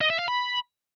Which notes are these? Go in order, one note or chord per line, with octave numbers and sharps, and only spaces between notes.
D#5
E5
F5
B5